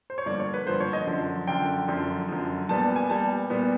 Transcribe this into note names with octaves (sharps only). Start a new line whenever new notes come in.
C5
C#5
G2 D3 F3 A#3 D5
C#5
B4
G2 D3 F3 A#3 C5
C#5
D#5
F#2 D3 F3
F#2 D3 F3 G5
F#2 D3 F3
F#2 D3 F3
A#2 G3 B3 A5
G#5
A#2 G3 B3 A5
A#2 G3 B3